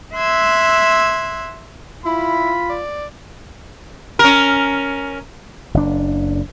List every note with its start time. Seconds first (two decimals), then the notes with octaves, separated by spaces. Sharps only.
0.15 E5 C6 E6 F#6 G#6
2.06 E4 F4 B5
2.69 D5
4.19 C#4 A#4
5.74 F#1 D4